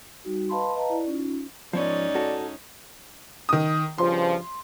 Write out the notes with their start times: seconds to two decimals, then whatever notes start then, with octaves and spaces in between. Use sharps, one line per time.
0.24 G3 D#4 F#4
0.49 B4 D#5 F5 A5 B5 C6
0.76 B4 D#5 F5 A5 A#5
0.89 E4 D5
1.06 C#4 D#4 F4
1.73 G#2 F3 B3 C#4 D#4 C#5 D5
2.15 F#4 A4
3.49 D#3 D#6
3.98 G2 C#3 F3 C6